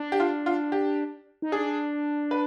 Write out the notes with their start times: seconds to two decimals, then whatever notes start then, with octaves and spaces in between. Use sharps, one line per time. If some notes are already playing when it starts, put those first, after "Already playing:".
Already playing: D4
0.12 G4
0.20 F4
0.46 F4
0.72 G4
1.42 D#4
1.52 D4 G#4
2.31 B4